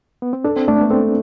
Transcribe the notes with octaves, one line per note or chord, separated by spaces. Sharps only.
B3
C4
D4 A4
C4
A3 D4
B3
C4 A4